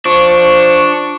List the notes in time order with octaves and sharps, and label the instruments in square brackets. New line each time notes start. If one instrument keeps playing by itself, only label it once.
[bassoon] F3 [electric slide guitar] D4 [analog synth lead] C#6